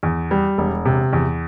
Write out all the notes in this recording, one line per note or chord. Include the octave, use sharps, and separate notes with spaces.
E2
G3
E1
C3
E2